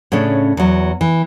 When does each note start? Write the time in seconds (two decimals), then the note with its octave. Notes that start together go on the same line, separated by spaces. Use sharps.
0.12 A2 C#3 C#4 D4
0.57 E2 F#3
1.01 E3